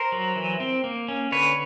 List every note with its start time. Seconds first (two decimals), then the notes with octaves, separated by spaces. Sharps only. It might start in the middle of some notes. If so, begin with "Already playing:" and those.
Already playing: A#4 C5
0.12 F#3
0.36 E3
0.60 C4
0.84 A#3
1.08 C#4
1.32 D3 B4 C#5